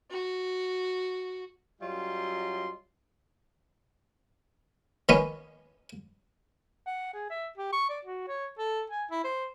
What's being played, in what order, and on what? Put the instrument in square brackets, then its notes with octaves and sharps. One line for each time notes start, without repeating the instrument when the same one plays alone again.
[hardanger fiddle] F#4
[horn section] F#2 F#3 G3 F4 D#5 C6
[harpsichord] D#3 B3 C#4
[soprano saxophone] F#5
G#4
E5
G4
C#6
D5
F#4
C#5
A4
G#5
E4
C5